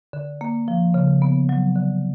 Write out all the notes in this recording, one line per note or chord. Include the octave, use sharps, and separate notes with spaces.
D3
A#3
F3
C#3
B3
F#3
D3